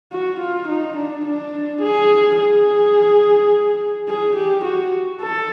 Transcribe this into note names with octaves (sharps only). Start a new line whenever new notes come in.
F#4
F4
D#4
D4
D4
G#4
G#4
G#4
G4
F#4
A4